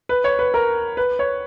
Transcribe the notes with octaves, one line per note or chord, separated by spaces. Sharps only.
B4
C#5
B4
A#4
B4
C#5